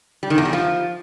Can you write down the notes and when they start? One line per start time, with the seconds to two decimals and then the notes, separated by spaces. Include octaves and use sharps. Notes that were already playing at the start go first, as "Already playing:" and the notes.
0.23 G3
0.30 D#3
0.38 E2
0.45 G3
0.53 F3